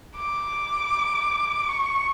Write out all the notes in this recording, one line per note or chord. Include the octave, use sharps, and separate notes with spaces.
D6
C#6